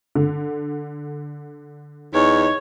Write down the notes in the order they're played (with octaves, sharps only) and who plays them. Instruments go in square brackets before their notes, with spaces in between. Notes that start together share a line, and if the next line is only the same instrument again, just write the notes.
[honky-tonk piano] D3
[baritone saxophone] E2 [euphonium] D#4 [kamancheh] C#5